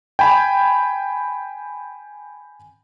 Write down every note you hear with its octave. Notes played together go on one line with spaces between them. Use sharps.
G5 G#5 B5